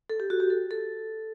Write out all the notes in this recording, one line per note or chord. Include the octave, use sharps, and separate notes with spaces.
A4
G4
F#4
G4
A4
A4